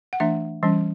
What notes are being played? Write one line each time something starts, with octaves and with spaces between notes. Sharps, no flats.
F#5
E3 A3 D4 E5
E3 G3 C#4